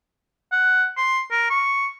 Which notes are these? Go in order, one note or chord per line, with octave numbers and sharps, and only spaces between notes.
F#5
C6
A#4
C#6